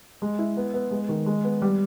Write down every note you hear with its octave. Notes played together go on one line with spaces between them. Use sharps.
G#3
E4
B3
B3
G#3
D#3
G#3
B3
G3